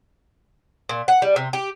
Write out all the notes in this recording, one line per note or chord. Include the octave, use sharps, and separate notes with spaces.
A#2
F#5
G3
C3
G4